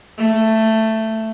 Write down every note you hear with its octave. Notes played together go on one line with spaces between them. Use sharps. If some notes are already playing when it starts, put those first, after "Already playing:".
A3